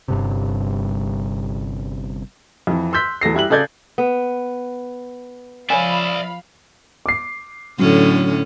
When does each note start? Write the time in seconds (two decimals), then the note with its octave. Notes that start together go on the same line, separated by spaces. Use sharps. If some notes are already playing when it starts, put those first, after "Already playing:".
0.08 G1 G2 C3
2.67 F2 E3
2.93 C6 E6 F#6 G6 B6
3.21 E2 A4 A#6 C7
3.34 G3 E4 G4 F#6 F#7
3.50 C#3 A4 D5 G6 G#6
3.98 B3
5.70 F3 C#5 D5 E5 F5 G#5 B5
7.06 D6 C7
7.79 A2 D3 F#3 C#4